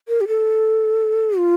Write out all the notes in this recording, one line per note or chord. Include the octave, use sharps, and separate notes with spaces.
A#4
G4
A4
F4